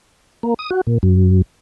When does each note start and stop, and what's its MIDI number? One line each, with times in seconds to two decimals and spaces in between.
0.43 0.54 58
0.59 0.70 87
0.71 0.81 66
0.87 0.98 46
1.03 1.42 42